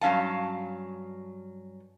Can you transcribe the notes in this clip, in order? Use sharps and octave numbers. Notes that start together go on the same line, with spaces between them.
G2 F#3 C#4 F5 A5